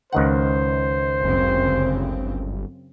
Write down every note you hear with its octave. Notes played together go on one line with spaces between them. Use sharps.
C#2 D#3 C5 F#5
G1 F#2 C#3 C4